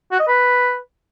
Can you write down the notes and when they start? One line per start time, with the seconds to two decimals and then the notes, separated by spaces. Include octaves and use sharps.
0.11 F#4
0.19 D#5
0.27 B4